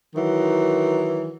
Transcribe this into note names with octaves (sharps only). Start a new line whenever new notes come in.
D#3 E3 F#3